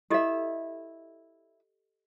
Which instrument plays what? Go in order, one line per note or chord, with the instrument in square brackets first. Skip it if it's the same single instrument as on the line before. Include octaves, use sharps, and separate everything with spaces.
[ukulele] E4 E5 [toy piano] G4 A4 D#5